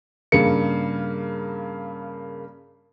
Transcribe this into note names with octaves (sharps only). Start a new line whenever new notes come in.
G2 C#3 A#3 C#7